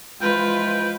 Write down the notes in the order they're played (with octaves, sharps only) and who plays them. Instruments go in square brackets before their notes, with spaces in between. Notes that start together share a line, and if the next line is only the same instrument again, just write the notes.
[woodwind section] E3 F3 G#3 [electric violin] F4 B4 [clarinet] G5